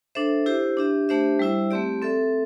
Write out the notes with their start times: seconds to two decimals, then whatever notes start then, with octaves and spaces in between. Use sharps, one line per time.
0.15 D4 A4 C5 E5
0.46 E4 G4 C5
0.77 D4 G4 E5
1.09 A3 D4 G4 C5 E5
1.39 G3 E4 C5 E5
1.71 A3 C4 G4 D5
2.02 C4 A4 E5